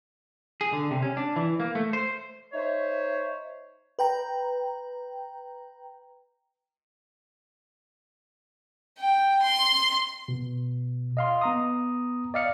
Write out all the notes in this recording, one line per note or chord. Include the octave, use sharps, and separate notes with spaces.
G#4
D3
C3
C#4
D4
E3
A#3
A3
C5
D#4 C5 C#5 E5
B4 G5 A#5
G5
C6
B2
D#5 F5 C6
B3 A#5 D#6
D5 D#5 F5 F6 C#7